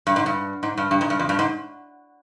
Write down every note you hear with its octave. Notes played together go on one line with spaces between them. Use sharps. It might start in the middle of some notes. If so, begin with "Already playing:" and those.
G2
G#2
G2
G#2
G2
G2
G#2
G2
F2
G2
G#2